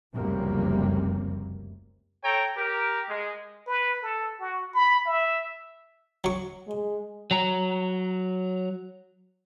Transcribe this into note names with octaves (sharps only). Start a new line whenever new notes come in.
F1 C#2 F#2 C3 G3 A#3
A4 C#5 G5 A#5
G4 A#4
G#3
B4
A4
F#4
B5
E5
F#3 C#6
G#3
F#3 A#5